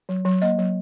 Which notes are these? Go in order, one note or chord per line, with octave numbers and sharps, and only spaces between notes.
F#3
F#3
A#3 D#5
F#3